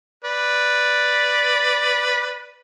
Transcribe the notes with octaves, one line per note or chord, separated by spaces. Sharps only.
B4 D5